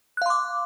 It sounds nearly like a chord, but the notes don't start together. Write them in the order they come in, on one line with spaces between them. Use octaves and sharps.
F#6 F5 C6 D6